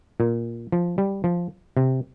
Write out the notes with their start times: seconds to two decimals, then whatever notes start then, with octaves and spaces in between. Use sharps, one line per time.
0.20 A#2
0.72 F3
0.98 G3
1.24 F3
1.77 C3